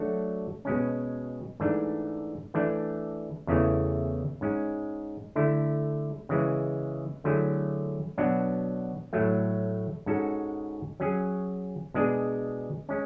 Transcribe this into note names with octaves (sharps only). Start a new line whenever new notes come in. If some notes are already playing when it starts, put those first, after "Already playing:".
Already playing: F#3 A3 D4 F#4 A4
B2 G#3 C#4
G#2 E3 A3 D4
E3 A3 D4
E2 C#3 E3 A3
G#2 G#3 C#4
D3 A3 E4
C#3 E3 G#3
D3 F#3 A3 E4 G#4
B2 F#3 B3 D4 F#4
A2 F#3 A3
G#2 G#3 C#4 F#4 A4
F#3 C#4 G#4
B2 G#3 D4 G#4
G#3 C#4